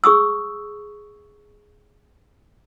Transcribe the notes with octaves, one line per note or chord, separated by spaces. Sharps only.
G#4 C#6 D#6 E6